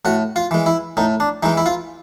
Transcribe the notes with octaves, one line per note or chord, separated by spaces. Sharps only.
A2 F#4
F4
E3 G#3
E4
A2 D#4
D4
E3 G#3 D#4
E4
F4